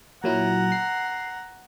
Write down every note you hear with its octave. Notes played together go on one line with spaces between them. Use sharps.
A#2 F#3 E4 F#5 A#5
C7